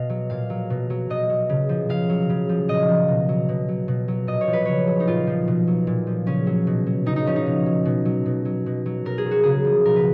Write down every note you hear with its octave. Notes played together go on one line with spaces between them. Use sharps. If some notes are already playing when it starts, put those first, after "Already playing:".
Already playing: B2 D#5 F5
F#3
A#2 F5
F#3
B2
F#3
B2 D#5
F#3
C#3
F3
C#3 F5
F#3
C#3
F3
A#2 D#5
F3
B2
F#3
B2
F#3
B2
F#3
A#2 D#5
C#5
F3
B4
C#3 C#5
F#3
D#4
A#2 F4
F3
B2
F#3
A#2
F3
C#3 C#4
F#3
B2
F#3
C#3 D#4
D#4
F3 C#4
D#4
B2
F#3
B2
F#3
B2
F#3
B2
F#3
B2 A#4
G#4
F#3
F#4
C#3 G#4
F3
B2 A#4
B4